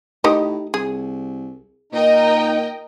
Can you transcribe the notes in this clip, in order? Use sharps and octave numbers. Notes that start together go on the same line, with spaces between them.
A2 D#4 G4 D#5
C2 G#4
A#2 D#4 A#4 D#5 G5